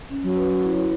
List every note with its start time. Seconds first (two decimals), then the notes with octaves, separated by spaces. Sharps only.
0.10 C#4
0.23 F#3
0.36 B4
0.63 E4